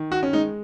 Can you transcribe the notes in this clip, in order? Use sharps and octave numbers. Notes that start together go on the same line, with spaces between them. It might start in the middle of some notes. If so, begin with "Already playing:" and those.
Already playing: D#3
F#4
C#4
G#3 D#4